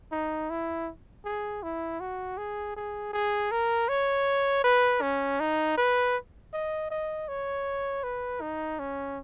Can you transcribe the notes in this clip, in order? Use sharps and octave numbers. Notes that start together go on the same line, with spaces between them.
D#4
E4
G#4
E4
F#4
G#4
G#4
G#4
A#4
C#5
B4
C#4
D#4
B4
D#5
D#5
C#5
B4
D#4
C#4